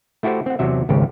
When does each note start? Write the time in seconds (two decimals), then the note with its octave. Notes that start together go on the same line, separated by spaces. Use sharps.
0.23 A3 E4 F#4 G4 C5
0.46 C4 F#5
0.59 E2 C3 F#3 E5
0.89 G#1 C#2 G4